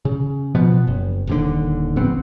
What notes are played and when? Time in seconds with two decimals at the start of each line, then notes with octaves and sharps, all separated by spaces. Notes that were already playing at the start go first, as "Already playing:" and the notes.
0.05 C#3
0.55 B2 F3 B3
0.87 F#1
1.27 D#1 D#2 D3
1.96 D1 A#1 B3 C4